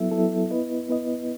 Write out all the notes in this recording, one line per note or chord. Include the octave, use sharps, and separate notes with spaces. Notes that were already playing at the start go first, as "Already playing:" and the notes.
Already playing: F#3 B3 E4 A4 E5
F#3 B3 E4 A4 E5
B3 E4 B4 D#5
B3 E4 B4 D#5